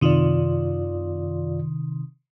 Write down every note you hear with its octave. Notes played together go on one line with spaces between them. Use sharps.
F#2 C3 D#3 F4 D5